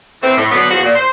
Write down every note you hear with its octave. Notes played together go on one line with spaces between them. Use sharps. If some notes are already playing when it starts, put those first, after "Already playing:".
E3 A3 C4
A2
B2 D3 F#3 B3
E2 F3 F#4
A#2
C5